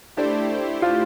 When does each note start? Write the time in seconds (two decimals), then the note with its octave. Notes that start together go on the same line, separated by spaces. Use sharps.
0.17 A3 D4 E4 G4 C5
0.82 F4